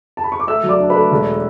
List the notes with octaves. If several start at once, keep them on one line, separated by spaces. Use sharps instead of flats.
A5
B5
C#6
D6
A3 E5 E6
F#3
D5 D6
D4
B4 B5
A3
E1